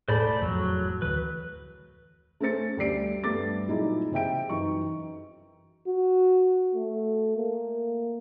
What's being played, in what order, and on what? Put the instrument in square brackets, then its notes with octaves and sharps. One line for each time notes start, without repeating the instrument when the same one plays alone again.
[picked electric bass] E1 [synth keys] A2 [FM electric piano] G#4 A4 [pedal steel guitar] C5 D5 B5
[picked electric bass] F#1 C2 F2 [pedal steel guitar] F#3
[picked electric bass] D2 E3 [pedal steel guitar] B4
[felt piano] A3 C#4 G#4 C5 A6 C#7
D2 G3 G4 D5 C7 D7
G2 G3 A3 B3 D6 A6
A#2 F#3 D#4 E4 G#4
C3 G#4 E5 G5 D7
F#2 E3 D#4 C#6
[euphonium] F#4
A3
A#3